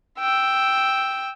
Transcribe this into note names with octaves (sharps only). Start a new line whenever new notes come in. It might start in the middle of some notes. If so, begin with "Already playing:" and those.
G5 E6